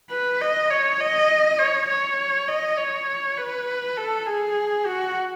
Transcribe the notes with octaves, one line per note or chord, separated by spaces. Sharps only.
B4
D#5
C#5
D#5
C#5
C#5
D#5
C#5
B4
A4
G#4
F#4